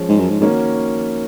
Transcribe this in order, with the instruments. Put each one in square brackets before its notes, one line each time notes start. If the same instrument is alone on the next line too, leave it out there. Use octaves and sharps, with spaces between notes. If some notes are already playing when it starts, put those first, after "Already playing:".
Already playing: [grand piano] F3 G#3 C#4
[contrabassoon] G#2
F#2
G#2
[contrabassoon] G#2 [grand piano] D#3 A#3 C#4 F#4 A#4